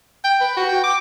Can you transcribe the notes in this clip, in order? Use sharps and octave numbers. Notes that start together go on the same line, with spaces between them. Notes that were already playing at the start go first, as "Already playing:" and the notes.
G5
B4
F#4
G5
D6